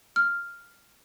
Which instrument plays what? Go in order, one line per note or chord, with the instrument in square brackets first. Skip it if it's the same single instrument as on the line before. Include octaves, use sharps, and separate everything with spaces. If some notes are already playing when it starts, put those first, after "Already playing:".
[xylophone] F6